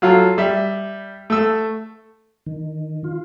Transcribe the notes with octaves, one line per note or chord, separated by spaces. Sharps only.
F#3 F4 A4
G3 E5
A3 E6
D#3
F4